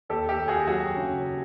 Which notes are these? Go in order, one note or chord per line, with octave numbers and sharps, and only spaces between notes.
D#2 G4 A4
G4 A4
D#2
F#4 G#4
F#3 F#4 G#4
C#3